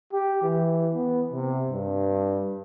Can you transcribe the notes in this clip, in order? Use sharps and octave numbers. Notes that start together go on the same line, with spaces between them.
G4
E3
B3
C3
G2